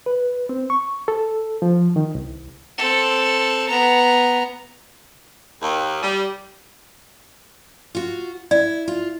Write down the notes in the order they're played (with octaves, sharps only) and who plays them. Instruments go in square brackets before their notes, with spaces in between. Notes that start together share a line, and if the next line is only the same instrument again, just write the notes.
[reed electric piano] B4
C4
C#6
A4
F3
D#3
C2
[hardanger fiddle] C4 A4
B3 A#5
[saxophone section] D#2
G3
[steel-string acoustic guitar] F4 F#4
[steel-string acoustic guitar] E4 [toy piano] D5
[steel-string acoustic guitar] F4